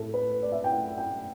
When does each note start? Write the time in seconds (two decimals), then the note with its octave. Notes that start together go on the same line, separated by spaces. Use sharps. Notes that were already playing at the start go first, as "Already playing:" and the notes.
Already playing: A2 A4
0.14 B4
0.43 D5
0.52 E5
0.64 G5
0.71 F#5
0.98 G5